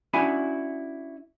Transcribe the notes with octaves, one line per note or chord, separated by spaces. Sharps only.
C#4 D4 E4 F#4 G#5 B5